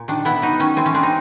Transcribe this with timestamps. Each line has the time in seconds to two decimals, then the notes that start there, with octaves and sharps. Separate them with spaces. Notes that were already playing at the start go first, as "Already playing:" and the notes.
Already playing: A#2
0.08 D#3 D4
0.25 B3 E4
0.42 F#3 D#4
0.60 D#3 C#4
0.77 E3 C4
0.86 C#4
0.94 C4 D4
1.03 D#4